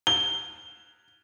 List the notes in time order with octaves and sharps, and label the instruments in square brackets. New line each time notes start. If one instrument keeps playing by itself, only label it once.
[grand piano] G7